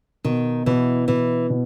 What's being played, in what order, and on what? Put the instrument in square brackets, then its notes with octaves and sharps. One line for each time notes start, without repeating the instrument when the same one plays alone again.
[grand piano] B2 [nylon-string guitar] D#3
[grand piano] B2 [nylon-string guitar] E3
[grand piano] B2 [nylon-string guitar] E3
[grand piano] B2